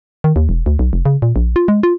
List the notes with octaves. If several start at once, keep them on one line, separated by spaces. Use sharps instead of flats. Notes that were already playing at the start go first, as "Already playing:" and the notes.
D#3
D#2
E1
D2
B1
F1
C#3
A#2
A#1
F4
G#3
F4